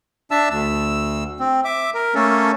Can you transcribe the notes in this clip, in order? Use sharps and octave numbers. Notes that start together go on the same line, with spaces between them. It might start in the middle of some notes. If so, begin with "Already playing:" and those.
D4 E5 A5 E6
D2 E6
C4
E5 D6
A#4
A3 A#3 C#4 A4